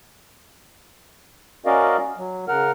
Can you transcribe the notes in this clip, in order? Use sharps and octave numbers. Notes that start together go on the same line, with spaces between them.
C#4 F#4 A#4 D5 D#5 F5
F#3
C#3 A#4 F#5 F6